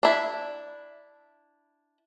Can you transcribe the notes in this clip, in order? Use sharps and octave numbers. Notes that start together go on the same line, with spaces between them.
D4 E4